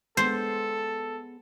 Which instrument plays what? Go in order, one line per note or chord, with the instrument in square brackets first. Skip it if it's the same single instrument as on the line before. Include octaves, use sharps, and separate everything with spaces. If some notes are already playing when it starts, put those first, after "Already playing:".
[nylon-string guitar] G#3 B3 [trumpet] A4 [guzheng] C5